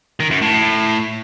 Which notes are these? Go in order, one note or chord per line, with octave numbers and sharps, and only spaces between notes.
D#3
F#2
A2